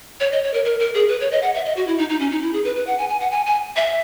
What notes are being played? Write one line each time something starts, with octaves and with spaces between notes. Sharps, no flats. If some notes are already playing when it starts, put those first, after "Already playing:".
C#5
D#5
C#5
A#4
A#4
A#4
G#4
B4
C#5
D#5
F#5
E5
D#5
F#4
E4
D#4
D#4
C#4
D#4
E4
G#4
B4
B4
F#5
G#5
G#5
F#5
G#5
G#5
E5